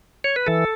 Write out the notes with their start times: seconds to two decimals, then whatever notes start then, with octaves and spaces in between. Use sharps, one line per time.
0.24 C#5
0.36 B4
0.47 E3 A4